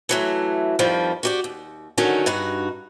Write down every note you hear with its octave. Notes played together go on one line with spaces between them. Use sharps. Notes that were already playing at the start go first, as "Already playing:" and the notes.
E3 F#3 A3
F2 D#3 F3 G3
F#4 G4 D5
D#2
D3 D#3 F#3 C#4 D#4
G2 D#4 F#4